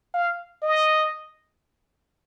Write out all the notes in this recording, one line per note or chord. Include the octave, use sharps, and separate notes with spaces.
F5
D#5